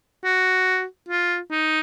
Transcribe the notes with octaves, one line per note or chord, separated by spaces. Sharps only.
F#4
F4
D#4